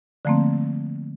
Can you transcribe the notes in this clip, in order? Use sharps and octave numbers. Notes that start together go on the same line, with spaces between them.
D3 F3 A3 A#3 C4